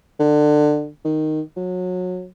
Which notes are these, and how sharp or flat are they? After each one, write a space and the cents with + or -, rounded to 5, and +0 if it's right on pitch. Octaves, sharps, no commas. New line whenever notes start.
D3 +25
D#3 -5
F#3 -25